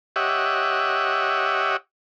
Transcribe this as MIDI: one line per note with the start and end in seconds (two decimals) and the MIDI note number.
0.16 1.77 67
0.16 1.77 73
0.16 1.77 75
0.16 1.77 76
0.16 1.77 78